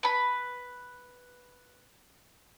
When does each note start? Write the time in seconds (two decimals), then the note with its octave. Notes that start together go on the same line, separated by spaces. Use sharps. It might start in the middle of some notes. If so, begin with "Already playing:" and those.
0.03 B4 B5